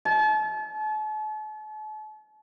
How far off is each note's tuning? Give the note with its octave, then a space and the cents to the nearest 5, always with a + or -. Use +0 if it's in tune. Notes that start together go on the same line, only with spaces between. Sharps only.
A5 -40